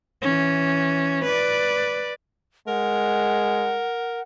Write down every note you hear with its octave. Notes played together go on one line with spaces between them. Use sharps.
E3 C#4
B4 D5
G#3 A#4 F#5